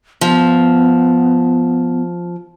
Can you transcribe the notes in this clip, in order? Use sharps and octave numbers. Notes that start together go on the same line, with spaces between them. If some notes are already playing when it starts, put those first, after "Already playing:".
F3 B3